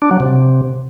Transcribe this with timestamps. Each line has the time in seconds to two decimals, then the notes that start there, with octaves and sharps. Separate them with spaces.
0.02 D4
0.11 F#3
0.20 C3